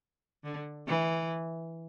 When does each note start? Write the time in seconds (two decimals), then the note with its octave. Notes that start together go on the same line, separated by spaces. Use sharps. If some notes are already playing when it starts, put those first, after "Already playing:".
0.44 D3
0.87 E3